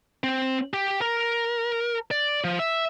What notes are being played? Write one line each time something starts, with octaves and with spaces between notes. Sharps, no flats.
C4
G4
A#4
D5
F3
E5